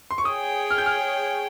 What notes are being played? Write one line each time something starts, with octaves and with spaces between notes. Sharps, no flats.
C6
C#6
G#4 C#5 G5 D#6
F6
G6
F6